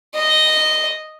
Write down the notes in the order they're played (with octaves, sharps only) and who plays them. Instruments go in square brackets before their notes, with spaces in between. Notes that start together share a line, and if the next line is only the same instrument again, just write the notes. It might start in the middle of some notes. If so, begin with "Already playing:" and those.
[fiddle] D#5